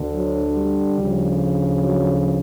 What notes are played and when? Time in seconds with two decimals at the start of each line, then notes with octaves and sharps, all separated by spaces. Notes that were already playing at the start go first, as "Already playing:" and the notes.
Already playing: D2 D3
0.12 F#3
0.55 G3
0.98 D2 C#3 F3
1.84 F#3